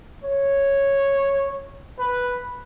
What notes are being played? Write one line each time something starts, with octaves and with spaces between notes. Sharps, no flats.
C#5
B4